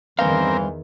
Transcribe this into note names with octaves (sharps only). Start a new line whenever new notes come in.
E2 G2 D#3 E3 C4 A#4 C5 F5